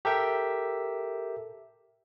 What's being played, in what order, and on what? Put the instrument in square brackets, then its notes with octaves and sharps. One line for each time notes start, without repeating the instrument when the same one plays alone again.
[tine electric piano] G4 A4 A#4 E5 G5